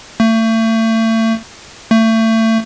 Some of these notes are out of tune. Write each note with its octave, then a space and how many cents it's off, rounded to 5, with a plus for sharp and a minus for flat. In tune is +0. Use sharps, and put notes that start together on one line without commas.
A3 +35
A3 +30